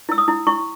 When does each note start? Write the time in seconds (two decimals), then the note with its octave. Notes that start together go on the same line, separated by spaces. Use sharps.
0.09 E4 E6
0.18 D#6
0.28 E4
0.47 E4 C#6